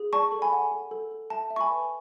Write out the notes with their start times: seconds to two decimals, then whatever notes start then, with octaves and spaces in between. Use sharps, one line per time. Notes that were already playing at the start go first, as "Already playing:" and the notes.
Already playing: G#4
0.13 D5 A5 C#6
0.32 A4
0.42 G#5 B5
0.52 F#5
0.72 A4
0.91 A4
1.11 A4
1.30 E5 A5
1.50 E5
1.56 C#6
1.60 G#5 B5
1.70 B4